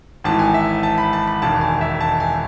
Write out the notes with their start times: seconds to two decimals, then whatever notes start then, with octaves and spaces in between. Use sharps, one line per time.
0.24 G#1 G#2 E3 A5
0.39 G#5
0.54 E5
0.83 A5
0.98 B5
1.13 A5
1.28 B5
1.42 E1 D#2 D#3 A5
1.61 G#5
1.81 E5
2.01 A5
2.20 G#5